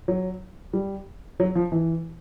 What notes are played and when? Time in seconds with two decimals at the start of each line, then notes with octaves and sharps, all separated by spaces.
0.08 F#3
0.73 G3
1.40 F#3
1.55 F3
1.72 E3